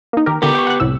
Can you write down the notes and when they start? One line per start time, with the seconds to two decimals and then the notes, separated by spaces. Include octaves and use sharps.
0.13 A#3 D#4
0.26 D#3 G4 A#4
0.42 D3 E3 B3 G4 A#4
0.55 G5 C#6
0.67 F#5 F#6
0.80 C2 A2 E6